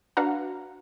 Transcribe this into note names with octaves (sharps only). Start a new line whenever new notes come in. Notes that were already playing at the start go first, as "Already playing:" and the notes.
D4 F#4 B4 F5 F#5 A#5